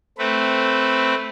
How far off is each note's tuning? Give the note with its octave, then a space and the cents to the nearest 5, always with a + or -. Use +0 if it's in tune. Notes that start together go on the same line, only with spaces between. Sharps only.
A3 +0 C4 +0 B4 +0